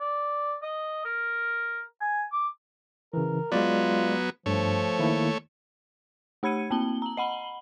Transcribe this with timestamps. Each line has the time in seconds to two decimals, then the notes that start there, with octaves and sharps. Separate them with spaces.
0.01 D5
0.62 D#5
1.05 A#4
2.01 G#5
2.32 D6
3.14 C#3 E3 A#4
3.52 F#3 G#3 B3 F4 D5
4.46 G2 F3 A3 C#5
4.99 D#3 A#3 E4
6.43 A3 G4 B5 G#6 C#7 D#7
6.71 A#3 C4 A5 G7
7.02 A#5 F#7
7.17 D#5 F#5 B5 F#7 G7